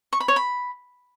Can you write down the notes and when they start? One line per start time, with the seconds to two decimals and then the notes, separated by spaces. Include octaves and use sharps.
0.13 C#6
0.20 B5
0.28 C#5
0.36 B5